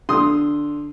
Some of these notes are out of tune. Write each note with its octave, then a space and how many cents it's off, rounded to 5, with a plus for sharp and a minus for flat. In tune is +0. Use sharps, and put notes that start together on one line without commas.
D3 +0 C6 +0 D#6 +0